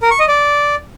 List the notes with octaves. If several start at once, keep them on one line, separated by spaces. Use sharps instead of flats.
A#4
C#6
D#5
D5